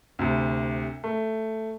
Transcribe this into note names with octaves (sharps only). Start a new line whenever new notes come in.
D2 C3
A3